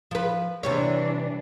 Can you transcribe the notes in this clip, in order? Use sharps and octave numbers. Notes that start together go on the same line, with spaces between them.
F3 B4
C3 E3 G3 D4 C#5